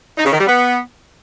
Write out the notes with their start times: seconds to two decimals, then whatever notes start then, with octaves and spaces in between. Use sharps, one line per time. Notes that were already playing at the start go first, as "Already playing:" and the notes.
0.17 D#4
0.25 C#3
0.32 D#3
0.40 G3
0.47 B3